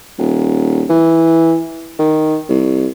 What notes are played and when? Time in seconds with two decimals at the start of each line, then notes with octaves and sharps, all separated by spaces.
0.18 D#1
0.90 E3
1.99 D#3
2.50 C2